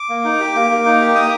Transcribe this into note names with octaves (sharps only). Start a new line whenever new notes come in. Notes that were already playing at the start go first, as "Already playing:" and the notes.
Already playing: D6
A#3
D#4
G4
A#3
A#3
D#4
G4
A#3 D#6